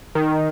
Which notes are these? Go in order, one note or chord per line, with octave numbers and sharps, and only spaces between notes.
D#3